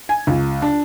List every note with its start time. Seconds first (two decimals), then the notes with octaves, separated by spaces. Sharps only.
0.09 G#5
0.27 C#2
0.62 D4